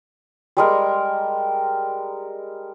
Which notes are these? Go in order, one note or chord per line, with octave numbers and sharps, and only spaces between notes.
G3 G#3 A#4